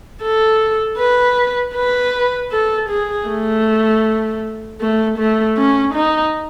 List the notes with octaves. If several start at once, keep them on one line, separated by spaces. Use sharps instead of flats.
A4
B4
B4
A4
G#4
A3
A3
A3
C#4
D#4